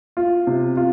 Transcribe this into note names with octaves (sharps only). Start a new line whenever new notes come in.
F4
C3
F4